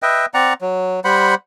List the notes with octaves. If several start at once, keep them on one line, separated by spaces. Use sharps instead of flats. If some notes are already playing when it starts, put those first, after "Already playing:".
B4 D#5 E5 G5
C4 D5 F#5 A#5
F#3
G3 C5 F#5 B5